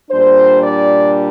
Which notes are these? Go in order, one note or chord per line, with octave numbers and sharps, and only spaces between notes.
A#2 G3 D4 C5
D5